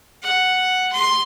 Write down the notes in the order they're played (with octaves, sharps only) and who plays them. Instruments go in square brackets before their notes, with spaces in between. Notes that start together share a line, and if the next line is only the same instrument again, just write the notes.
[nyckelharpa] F#5
C6